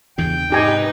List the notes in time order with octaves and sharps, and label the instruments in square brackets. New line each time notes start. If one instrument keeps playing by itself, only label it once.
[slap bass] E2 G2 C#3 [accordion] G5
[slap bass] G#2 C3 [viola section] D#4 B4 [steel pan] G4 G#5